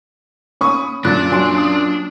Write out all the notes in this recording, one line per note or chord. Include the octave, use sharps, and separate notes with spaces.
A#3 C#4 B5 C#6 D#6
F#2 A#2 D4 F#6 A6
F#3 C#4 G#5 C6 D7
D#6